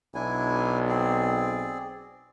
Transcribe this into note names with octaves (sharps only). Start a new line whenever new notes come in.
B1 D4 E4 G#5
C4 G#4 D5